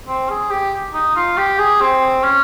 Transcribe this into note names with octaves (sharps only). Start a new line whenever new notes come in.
C4
G#4
G4
D#4
F4
G4
G#4
C4
C#4